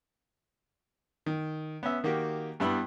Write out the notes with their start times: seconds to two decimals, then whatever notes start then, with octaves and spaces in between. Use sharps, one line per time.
1.26 D#3
1.83 B3 C#4 E5
2.04 D#3 A#3 F#4 G4
2.60 G2 G3 B3 E4 B5 E6